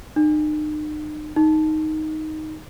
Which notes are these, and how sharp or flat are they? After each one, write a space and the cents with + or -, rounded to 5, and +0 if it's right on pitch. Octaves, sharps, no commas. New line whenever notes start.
D#4 -40
D#4 +0